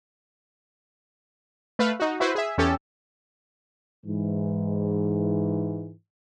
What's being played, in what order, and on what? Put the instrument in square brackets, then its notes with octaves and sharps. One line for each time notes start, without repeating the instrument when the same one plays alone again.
[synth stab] A3 B4 F5
D#4 F#4
E4 F#4 B4 C5
G#4 E5
E2 C#4 G4 A4
[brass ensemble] G#2 E3